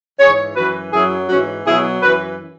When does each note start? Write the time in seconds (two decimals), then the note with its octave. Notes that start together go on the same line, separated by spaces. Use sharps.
0.19 G#2 E3 G#4 C#5
0.56 F#2 E3 F#4 B4
0.92 F#2 F#3 E4 G#4
1.29 G#2 E3 C#4 F#4
1.66 B2 F#3 E4 G#4
2.02 F#2 E3 F#4 B4